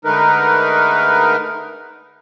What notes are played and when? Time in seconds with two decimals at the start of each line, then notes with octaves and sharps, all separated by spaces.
0.05 D3 G#3 A3 D#4 A#4 B4